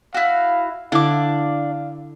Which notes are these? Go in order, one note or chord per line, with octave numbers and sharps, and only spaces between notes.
E4 F#4 F5
D3 D4 E4 F5 D6